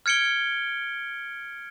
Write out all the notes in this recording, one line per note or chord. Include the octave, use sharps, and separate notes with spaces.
F6 G#6 C#7 D7 G7